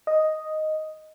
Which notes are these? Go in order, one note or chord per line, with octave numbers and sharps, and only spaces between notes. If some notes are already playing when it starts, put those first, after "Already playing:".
D#5